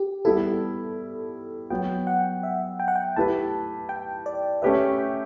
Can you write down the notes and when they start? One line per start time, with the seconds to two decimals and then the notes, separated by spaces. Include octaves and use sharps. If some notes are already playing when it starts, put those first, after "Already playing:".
Already playing: G4
0.25 G3 B3 E4 A4
1.70 F#3 B3 F#4 G5
2.07 F#5
2.43 E5
2.80 G5
2.88 F#5
2.96 G5
3.16 A3 E4 G4 B4 A5
3.89 G5
4.26 D5
4.62 A3 C#4 G4 B4 E5
4.98 G5